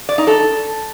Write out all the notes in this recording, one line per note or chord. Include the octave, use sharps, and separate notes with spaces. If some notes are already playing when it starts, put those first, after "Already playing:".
D5
D#4
A4